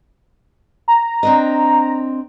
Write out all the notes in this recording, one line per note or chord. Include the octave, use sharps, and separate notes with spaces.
A#5
C4 D4 D#5